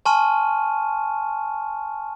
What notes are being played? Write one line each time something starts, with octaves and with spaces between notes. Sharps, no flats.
G#5 A5 C6 C#6 F6 D#7